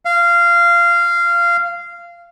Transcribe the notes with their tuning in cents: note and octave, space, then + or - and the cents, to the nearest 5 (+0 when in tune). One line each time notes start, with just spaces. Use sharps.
F5 -15